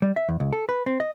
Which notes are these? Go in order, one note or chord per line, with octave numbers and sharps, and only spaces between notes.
G3
E5
E2
C#2
A4
B4
C4
D#5